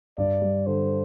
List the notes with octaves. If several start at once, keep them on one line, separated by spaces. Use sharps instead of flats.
G2 D5
G3
D3 C5